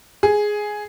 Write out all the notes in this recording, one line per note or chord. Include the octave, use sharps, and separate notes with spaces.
G#4